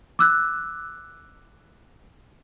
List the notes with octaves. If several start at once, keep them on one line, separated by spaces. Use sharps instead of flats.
D6 E6 F#6